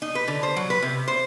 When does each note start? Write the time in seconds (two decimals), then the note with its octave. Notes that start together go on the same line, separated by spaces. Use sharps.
0.02 D#4
0.15 B4
0.28 D3
0.43 C5
0.56 F#3
0.70 B4
0.82 C3
1.08 C5